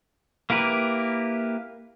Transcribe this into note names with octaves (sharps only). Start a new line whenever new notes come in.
A#3 E4 G4 A#4 B4